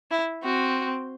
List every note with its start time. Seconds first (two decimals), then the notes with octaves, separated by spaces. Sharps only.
0.11 E4
0.43 C4 F#4